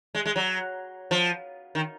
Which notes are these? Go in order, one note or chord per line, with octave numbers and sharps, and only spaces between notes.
G#3
G#3
F#3
F3
D#3